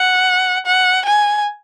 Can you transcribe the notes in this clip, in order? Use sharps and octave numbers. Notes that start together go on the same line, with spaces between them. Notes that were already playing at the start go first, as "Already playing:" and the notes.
Already playing: F#5
F#5
G#5